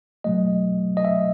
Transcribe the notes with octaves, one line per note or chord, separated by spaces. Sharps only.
B2 F#3 A3 D#5
D#5
E5